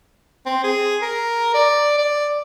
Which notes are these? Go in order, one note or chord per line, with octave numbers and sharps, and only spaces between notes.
C4
G#4
A#4
D5
D5